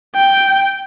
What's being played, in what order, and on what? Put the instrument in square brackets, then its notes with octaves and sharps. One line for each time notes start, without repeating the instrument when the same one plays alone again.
[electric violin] G5